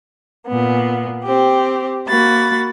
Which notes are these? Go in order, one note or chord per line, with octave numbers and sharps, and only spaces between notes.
A#2 B3
C4 G4
A#3 F#4 B5 A6